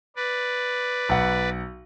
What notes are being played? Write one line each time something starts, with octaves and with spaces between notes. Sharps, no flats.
B4 D5
B1 F#5